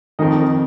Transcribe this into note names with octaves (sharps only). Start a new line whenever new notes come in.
F2 D#3 D#5